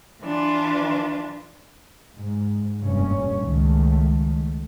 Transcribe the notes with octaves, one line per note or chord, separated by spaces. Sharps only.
E3 D4 F4
G#2
F1 G2 A#2 C#4
C#2 D#3 A3